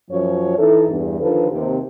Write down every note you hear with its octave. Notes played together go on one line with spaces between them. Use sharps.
F#2 F3 C#5
E3 D#4 E4 A4
E2 G2
D3 D#3 F3 F4 A4 B4
D#2 C3